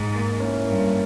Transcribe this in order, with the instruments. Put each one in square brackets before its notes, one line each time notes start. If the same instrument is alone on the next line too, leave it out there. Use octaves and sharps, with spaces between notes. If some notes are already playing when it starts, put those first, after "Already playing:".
Already playing: [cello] G#2
[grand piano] A#3
C#4 E4
[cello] G2 [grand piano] A#3